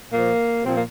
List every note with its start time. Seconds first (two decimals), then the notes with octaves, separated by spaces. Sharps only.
0.12 A#2 F3 A#3
0.64 A#2 F3 C4
0.74 A#3